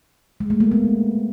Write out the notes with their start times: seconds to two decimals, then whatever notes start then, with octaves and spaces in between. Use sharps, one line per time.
0.40 G#3
0.50 A3
0.60 A#3
0.72 B3